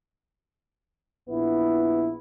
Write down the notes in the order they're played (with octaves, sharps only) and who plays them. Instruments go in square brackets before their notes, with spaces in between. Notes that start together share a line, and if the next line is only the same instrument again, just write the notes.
[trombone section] A#1 B3 E4